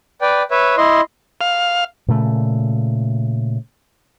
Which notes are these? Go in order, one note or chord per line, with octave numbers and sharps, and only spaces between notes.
B4 D5 G5
B4 C#5 E5
E4 D#5 C6
F5
A#2 C#3 A3